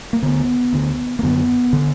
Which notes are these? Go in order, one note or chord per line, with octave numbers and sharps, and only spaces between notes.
A#3
D2 D3 B3
D2 D3
A#3
F#2 D3 B3
D3